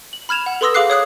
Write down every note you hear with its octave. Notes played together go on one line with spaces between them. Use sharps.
F#7
B5 F6 G#6 E7 F7
F#5
A4 B4 C6 D#6 E6 A#6
G#4 F5 D6 F#6 C7
C#5 D#6 F#6 C7